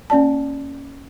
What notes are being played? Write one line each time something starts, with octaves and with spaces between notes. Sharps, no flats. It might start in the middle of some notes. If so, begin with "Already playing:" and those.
A#3 C#4 D5 A5